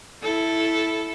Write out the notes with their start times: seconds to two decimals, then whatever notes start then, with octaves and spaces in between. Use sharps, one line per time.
0.23 E4 A4